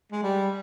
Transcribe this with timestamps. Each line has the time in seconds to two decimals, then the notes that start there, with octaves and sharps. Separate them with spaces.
0.12 G#3
0.22 G3